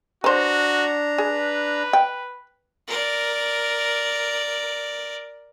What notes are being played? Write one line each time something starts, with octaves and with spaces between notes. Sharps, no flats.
D4 F#4 B4 C5 A#5
G#4 B4
G5
A#4 D5